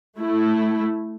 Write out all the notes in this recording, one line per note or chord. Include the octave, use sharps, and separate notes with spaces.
A3 E4